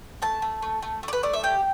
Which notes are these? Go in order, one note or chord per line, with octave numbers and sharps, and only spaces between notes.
A3 A5
A3
A3
A3
A3
D5
B4
A3 D5
E5
G4 G5